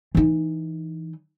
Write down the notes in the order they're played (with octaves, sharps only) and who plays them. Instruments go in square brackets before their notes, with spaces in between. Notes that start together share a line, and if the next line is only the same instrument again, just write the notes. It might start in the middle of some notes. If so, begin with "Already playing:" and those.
[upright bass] E3 D#4